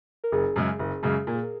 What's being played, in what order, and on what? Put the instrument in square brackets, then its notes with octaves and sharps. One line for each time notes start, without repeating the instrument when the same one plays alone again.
[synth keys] A#4
[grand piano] F#1 [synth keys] G#4
[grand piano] F#2 C#3 G#3 [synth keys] G#4
[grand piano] F#1
F#2 C#3 G#3
[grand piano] A#2 [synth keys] A#4
[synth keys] G#4
A#4